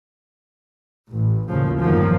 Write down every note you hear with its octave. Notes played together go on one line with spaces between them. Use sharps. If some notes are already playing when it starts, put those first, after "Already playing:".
A1
A1 D#2 A2 C#3 F3
G1 F2 D#3 F3 F#3 A#3